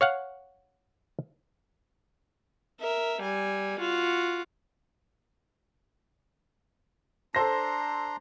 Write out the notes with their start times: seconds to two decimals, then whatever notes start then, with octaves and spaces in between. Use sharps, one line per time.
0.01 C#5 F5 F#5
2.81 A#4 E5
3.22 G3 G#5
3.81 F4 F#4
7.35 D4 A4 C5 A#5 C6 A#6